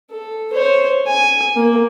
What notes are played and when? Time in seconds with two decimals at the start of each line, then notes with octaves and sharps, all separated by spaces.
0.11 A4
0.52 C5 C#5
1.07 G#5
1.56 A#3